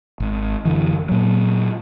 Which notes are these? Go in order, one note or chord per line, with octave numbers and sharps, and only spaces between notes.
G#1
F#2 D3 E3
A#2 F#3